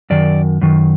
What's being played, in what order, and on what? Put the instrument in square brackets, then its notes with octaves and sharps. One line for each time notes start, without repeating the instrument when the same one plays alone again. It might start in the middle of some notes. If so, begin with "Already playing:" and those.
[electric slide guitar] F#2 D#3 D5
F#2 D#3